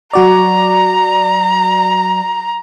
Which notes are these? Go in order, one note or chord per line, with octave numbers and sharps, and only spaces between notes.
F#3 F#4 D5 A#5